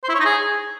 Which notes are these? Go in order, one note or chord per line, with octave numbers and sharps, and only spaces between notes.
C5
E4
C#5
D#4
G#4